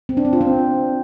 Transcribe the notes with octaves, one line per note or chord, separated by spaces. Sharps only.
C4
D4
C4
F4
C4